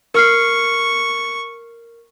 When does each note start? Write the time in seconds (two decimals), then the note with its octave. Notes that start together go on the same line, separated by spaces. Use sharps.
0.14 A#4 C#6 F6 C7